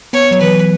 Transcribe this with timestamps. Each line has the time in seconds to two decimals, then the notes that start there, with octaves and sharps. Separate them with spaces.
0.13 B3 C#5
0.31 F#3
0.41 E3 B4